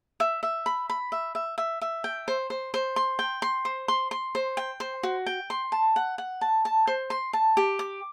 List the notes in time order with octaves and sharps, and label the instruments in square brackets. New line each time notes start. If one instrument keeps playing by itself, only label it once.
[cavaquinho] E5
E5
B5
B5
E5
E5
E5
E5
G5
C5
C5
C5
C6
G5
C6
C5
C6
C6
C5
G5
C5
F#4
G5
C6
A5
F#5
F#5
A5
A5
C5
C6
A5
G4
D6